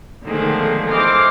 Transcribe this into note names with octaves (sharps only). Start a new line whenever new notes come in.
B2 D3 D#3 F3 G#3 A3
E3 C5 D#5 D6 F6